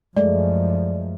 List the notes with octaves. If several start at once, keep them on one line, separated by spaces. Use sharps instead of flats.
F#2 F3 G#3 A3 D5